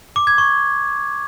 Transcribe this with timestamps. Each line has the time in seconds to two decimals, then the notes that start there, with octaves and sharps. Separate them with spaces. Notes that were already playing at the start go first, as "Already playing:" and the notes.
0.16 D6
0.27 G#6
0.38 C#6